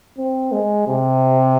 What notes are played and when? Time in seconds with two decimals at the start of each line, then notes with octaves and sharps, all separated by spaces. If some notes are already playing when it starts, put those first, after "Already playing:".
0.18 C4
0.52 G#3
0.87 C3